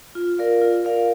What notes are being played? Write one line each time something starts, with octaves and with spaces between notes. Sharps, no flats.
F4
A#4 D5 F5
F4
A#4 D5 F5